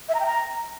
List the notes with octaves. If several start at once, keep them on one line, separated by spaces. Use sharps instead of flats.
E5
A#5
G5
A#5